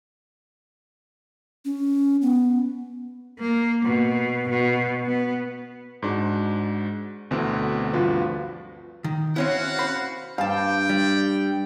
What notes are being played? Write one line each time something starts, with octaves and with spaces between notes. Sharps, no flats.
C#4
B3
A#3
B2
B2
B3
G#2 D4 F#4
D2 B2 D3 E3 C4
D2 G2 F3 F4 F#4 B4
D#3
C4 C#4 E4 F#4 F5 F#5
C5 B5
G2 F5 G5 A5
G3